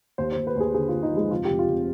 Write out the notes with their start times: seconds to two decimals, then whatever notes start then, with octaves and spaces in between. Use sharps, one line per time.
0.18 D#2 C5
0.32 D#2 C5
0.47 B4
0.56 D#2 G#4
0.74 D3 G#4
0.89 D#2 F4
1.03 D#4
1.12 F3 G#3
1.31 F1 F4
1.45 F1 G4
1.59 F4
1.69 F1